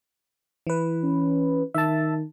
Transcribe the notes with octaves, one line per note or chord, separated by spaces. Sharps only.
E3 B4
C#4
D#3 E5 A5